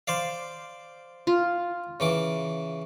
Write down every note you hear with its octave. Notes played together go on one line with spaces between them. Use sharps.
C5 D5 F5
F4
C#3 E3 D6